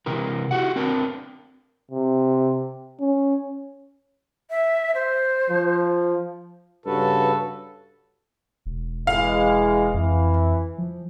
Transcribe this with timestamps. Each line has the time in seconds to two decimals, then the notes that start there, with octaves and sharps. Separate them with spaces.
0.06 C3 E3 A#4
0.51 E4 F#4 G4 F#5
0.76 C4 D4 A#4
1.91 C3
3.00 C#4
4.50 E5
4.95 C5
5.50 F3
6.86 G2 C#3 F#4 A4 B4
8.66 E1
9.07 E3 G#3 F5
9.94 F2 E3
10.78 F3